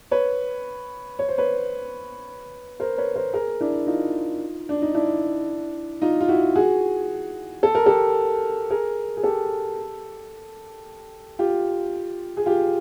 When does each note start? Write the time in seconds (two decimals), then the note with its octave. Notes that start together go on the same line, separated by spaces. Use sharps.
0.11 B4 C#5
1.19 C#5
1.29 C5
1.38 B4 C#5
2.80 A#4 C5
2.98 B4 C#5
3.15 A#4 C5
3.33 G#4 A#4
3.61 D4 E4
3.87 D#4 F4
4.69 D4
4.82 D#4
4.94 D4 E4
6.02 D#4 F4
6.21 F4
6.29 E4 F#4
6.55 F#4 G#4
7.63 A4
7.75 A#4
7.86 G4 A4
8.70 G#4 A#4
9.17 G#4
9.23 G4 A4
11.39 F4 G4
12.37 G#4
12.46 F4 G4